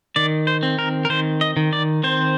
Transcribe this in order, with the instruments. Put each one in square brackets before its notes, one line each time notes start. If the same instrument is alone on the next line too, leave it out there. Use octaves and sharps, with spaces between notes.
[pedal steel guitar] D#3 D5
C5
C4
A#4
A#4
D#3 C5
D#5
D#3
D5
C4 C5